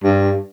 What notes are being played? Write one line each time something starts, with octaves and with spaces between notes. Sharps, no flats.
G2